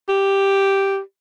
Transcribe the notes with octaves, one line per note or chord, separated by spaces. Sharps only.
G4